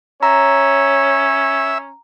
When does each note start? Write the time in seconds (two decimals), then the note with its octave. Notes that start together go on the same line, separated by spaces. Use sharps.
0.23 C#4 C#5 E5 A#5